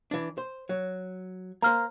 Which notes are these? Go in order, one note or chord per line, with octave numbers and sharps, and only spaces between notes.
E3 D4
C5
F#3
A#3 C5 A#5 F6